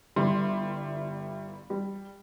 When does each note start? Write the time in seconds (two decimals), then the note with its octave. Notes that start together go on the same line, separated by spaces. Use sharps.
0.16 G1 G3 E4 C6
1.70 G3